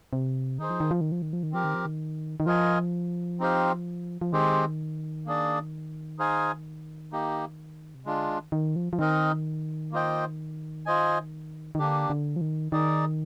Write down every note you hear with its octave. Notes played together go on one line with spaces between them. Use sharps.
C3
D#3 D#4 G#4 C5
F3
D#3
F3
D#3
F3
D#3
F3
D#3
F3 C4 G4 A#4
D#3
F3
D#3
D#3
F3 F4 A#4 D#5 G#5
C4 D#4 G4 C5 F5
F3
D#3 G#3 C4 G4 C5
A#3 D4 G#4 D5
D#4 G#4 C5 F5 G#5
A#3 D#4 G4
C3
D3 G#3 D4 F4
D#3
D#3
F3
F3
D#3 C4 D#4 A#4 D#5
A#3 F4 C5 D#5 G5
F4 C5 D#5 G#5
D#3
D3 A#3 D4 G4
D3
F3
D#3
D#3 D#4 G#4 D5